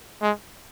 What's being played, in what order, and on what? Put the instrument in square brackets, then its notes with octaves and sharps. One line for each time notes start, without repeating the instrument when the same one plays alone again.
[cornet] G#3